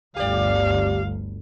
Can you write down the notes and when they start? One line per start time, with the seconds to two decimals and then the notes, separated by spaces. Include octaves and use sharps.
0.16 G1 D2 G4 D5 F5